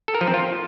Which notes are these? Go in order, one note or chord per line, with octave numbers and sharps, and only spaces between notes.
A4
A#4
F3
C4
F4